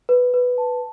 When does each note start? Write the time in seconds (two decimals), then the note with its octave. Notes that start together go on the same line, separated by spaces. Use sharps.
0.09 B4
0.34 B4
0.58 A5